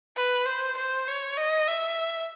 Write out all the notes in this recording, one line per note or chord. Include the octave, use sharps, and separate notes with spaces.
B4
C5
C5
C#5
D#5
E5